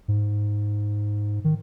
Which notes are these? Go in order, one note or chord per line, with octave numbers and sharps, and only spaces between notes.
G#2
D#3